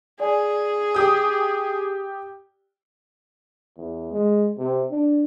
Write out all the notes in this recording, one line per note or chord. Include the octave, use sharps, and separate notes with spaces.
G#4 D5 G#5
G4 D#6
E2
G#3
C3
D4